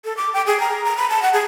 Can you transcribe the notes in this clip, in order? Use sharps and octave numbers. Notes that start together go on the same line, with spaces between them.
A4
D6
G5
G#4
A#5
A#5
B5
A5
F#5
G#4